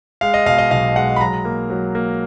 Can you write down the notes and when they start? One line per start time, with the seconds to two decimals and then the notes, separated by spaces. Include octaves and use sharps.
0.21 G#3 F5
0.34 D#5
0.46 B2 F5
0.58 D#5
0.71 B1 F5
0.96 G#3 F#5
1.16 B5
1.21 F#3 A#5
1.45 A#3
1.70 F#3
1.95 A#3